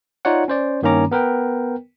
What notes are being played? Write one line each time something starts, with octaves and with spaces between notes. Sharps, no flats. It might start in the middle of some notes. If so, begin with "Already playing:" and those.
D#4 F4 C#5 D5 F#5
C#4 C5 D5
G2 D#3 A#3 C#4 A#5 D6
B3 A#4 B4 G5